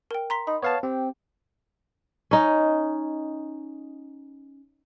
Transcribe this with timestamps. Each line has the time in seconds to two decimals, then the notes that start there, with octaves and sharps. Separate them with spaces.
0.11 A#4 G5
0.30 A#5 C6 B6
0.47 D#4 B5
0.62 B3 C#5 F5 A5
0.83 C4 G4
2.31 C#4 D#4